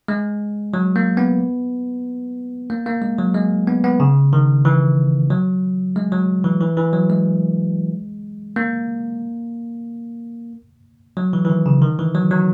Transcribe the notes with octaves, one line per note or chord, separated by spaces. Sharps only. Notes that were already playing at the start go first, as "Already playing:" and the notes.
G#3
F#3
A#3
B3
A#3
A#3
G#3
F#3
G#3
B3
B3
C#3
D#3
E3
F#3
G#3
F#3
E3
E3
E3
F#3
G#3
A#3
F#3
E3
E3
D#3
C#3
D#3
E3
F#3
F#3